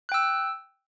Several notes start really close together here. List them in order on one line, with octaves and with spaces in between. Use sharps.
F#6 G5 E6